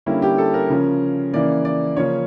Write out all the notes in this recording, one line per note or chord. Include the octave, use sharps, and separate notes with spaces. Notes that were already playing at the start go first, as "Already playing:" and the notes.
D3 G3 A#3 C#4 E4
G4
A4
A#4
C#3 F3 C#4
C#3 E3 A#3 D5
D5
C#3 F3 A#3 C#4 C#5